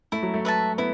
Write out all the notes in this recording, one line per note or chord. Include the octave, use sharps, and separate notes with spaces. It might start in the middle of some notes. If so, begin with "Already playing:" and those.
A3 E4
F#3
A3
B4 E5 A5
B3 E4